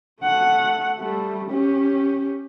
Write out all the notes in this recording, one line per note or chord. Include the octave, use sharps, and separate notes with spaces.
A3 F#5
G3 A3
C#4 G4